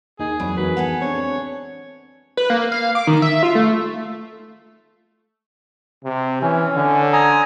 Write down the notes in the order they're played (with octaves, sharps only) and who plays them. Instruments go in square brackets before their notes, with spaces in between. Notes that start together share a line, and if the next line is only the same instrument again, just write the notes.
[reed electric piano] D#2 D#4 [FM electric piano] A#3 [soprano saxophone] G#4
[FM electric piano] F2 E3 D5 [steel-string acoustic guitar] F#3 [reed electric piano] C4 B5
[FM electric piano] F2 E3 G#3 [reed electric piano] D#4 F#4 A#4 [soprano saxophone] B4
[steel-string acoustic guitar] B3 G#4 A4 [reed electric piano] F#5
[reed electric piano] C4 D4 [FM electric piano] B4 [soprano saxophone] C#5
[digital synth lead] B4
A#3
F5
D6
D#3
E5
F4
A3
[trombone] C3
[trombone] E3 [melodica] C#4
[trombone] D3
[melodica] G#5 A#5 D#6